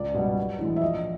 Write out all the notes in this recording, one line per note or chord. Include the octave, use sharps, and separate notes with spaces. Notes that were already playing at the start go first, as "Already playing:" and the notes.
Already playing: C#2 D5
B2 G3
B1
A2 E3 G#3
E5
A#1 D#5